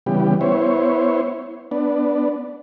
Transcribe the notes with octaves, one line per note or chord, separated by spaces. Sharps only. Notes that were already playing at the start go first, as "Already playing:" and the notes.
C#3 E3 G3 B3 G4
B3 E4 C5 C#5
B3 D4